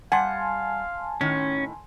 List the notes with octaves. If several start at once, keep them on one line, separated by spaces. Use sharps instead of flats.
G3 F5 F#5 G#5 A5 C6
A2 D#3 C#4